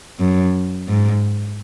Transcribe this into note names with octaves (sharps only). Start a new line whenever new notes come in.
F#2
G#2